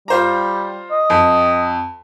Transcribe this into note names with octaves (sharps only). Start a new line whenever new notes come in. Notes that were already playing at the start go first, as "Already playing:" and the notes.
G3 F4 C5 A#5
D#5
F2